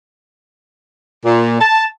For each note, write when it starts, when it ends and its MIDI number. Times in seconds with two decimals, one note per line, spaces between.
1.25 1.60 46
1.60 1.84 81